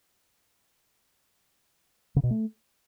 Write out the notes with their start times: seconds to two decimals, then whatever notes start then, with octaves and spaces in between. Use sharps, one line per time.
2.16 C#3
2.23 B2
2.31 A3